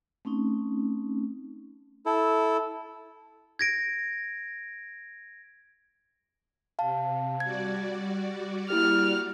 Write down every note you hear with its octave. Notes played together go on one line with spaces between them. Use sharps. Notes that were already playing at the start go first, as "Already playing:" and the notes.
A3 C4 C#4 D#4
E4 A4
G#6 A#6 D7
C3 F5 A5
G3 F#4 D5 G#6
A#3 E4 G4 F6